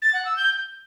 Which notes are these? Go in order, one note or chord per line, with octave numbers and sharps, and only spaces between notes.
A6
F#5
E6
G6